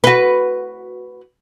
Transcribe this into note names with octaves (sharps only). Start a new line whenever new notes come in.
F#4 B4